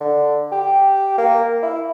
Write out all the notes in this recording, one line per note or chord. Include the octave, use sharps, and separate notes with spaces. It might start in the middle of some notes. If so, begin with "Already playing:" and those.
D3
G4
A#3
E4